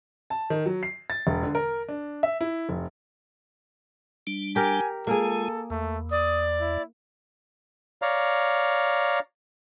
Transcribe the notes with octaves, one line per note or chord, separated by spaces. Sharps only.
A5
D#3
F#3
C7
A6
E1
D3
A#4
D4
E5
E4
F1
G3 D4
G4 A#4 G#5
G#3 A#3 F4 G#4 A4
E2 A3
D5 D#6
E4
C#5 D5 F5 A#5